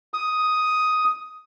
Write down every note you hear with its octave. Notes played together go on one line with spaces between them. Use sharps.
D#6